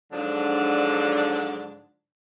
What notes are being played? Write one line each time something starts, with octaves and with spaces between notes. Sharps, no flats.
G#2 D3 F3 F#3 D4